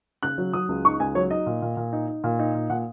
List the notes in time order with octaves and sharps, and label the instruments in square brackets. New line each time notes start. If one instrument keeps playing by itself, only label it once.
[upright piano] C#3 F#6
F#3
F#3 D#6
C#2
D#4 C#6
C#2 G#5
F#3 C#5
D#4 D#5
A#2
A#2
A#2
D#4
D#4
A#2
D#4
A#2
A#2 F#5